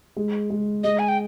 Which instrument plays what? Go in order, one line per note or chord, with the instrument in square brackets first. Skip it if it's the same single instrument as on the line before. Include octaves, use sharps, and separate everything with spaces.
[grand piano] G#3
G#3
[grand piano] G#3 [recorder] D#5
[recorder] G#5
G5